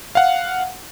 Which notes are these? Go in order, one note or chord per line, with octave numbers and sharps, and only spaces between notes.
F5 F#5